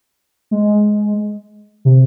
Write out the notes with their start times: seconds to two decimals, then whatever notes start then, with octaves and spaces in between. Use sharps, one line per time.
0.51 G#3
1.85 C3